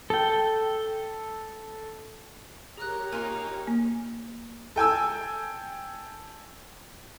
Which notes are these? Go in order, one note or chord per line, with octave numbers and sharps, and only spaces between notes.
A4 G5
G4 G#4 A#4 C#5 A#5 F6 F#6
A#3 D#4 F4 G#5
A#3
A4 G5 G#5 E6